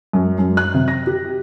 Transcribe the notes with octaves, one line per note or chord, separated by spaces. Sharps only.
F#2
F#2
F#6
C3
A#6
G4